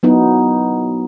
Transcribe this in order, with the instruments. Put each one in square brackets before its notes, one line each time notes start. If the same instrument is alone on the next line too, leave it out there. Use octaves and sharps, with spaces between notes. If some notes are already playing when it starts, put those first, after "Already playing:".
[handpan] F#3 B3 D#4 E4